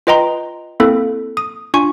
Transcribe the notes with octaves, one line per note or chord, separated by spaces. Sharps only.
F4 B4 D#5 G5 A#5 C6
A#3 C4 E4 A4
D#6
D4 F4 G#5 C#6